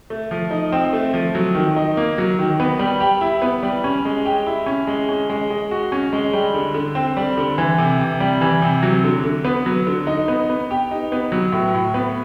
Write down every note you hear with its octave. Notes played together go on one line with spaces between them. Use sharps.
A3
F3
D#4
C4
A3
F3
F#3
D#3
D#4
A#3
F#3
D#3
B3
G3
G4
E4
B3
G3
C#4
G#3
G4
E4
C#4
G#3
C#4
G#3
G#3
F#4
C#4
G#3
G3
D3
D3
C4
G3
D3
E3
C3
C3
G3
E3
C3
F#3
D3
D3
B3
F#3
D3
D#4
B3
B3
G4
D#4
B3
F#3
A2
A2
B3